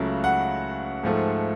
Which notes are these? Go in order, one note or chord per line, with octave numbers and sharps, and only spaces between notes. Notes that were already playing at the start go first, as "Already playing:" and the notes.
Already playing: C#2 C#3 F#3 A3
F#5
G#2 F3 A3